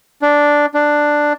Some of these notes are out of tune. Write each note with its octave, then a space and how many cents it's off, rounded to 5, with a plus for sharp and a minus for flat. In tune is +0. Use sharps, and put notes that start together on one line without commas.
D4 -5
D4 +5